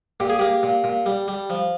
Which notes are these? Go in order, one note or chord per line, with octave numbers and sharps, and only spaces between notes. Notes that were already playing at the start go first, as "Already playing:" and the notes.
A#2 G4
G#4
A#3 G4
A#2
A#2
G3
G3
F3